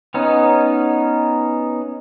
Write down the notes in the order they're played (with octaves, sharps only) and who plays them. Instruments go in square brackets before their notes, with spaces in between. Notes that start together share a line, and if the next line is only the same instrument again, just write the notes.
[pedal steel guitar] B3 C#4 D#4